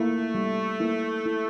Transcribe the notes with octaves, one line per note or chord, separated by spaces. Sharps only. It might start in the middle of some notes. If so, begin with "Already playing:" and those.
Already playing: A3 A#3 E4
G3
A#3 E4
E4